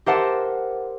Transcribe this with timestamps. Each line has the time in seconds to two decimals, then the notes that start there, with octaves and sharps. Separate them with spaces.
0.06 G4 A#4 C5 E5 F#5 A5